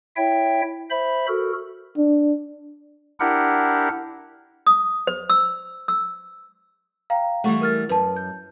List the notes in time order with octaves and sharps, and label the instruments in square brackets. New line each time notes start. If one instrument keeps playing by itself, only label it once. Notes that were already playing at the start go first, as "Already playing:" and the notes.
[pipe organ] E4 C#5 E5 G5
C5 E5 B5
F#4 A4 A#4
[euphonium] D4
[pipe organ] D4 E4 G4 A#4 F#5
[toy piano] D#6
C5
E6
E6
[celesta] F5 G5 A#5
[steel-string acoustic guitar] E3 G3 A3 [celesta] F#5 C#6
[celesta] A#4 F6 A6
[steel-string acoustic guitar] F#2 [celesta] B4 A5
[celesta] G6